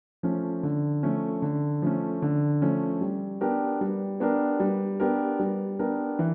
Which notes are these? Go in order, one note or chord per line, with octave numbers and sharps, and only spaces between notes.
F3 A3 C#4
D3
F3 A3 C#4
D3
F3 A3 C#4
D3
F3 A3 C#4
G3
B3 D4 G4 A#4
G3
B3 D4 G4 A#4
G3
B3 D4 G4 A#4
G3
B3 D4 G4 A#4
E3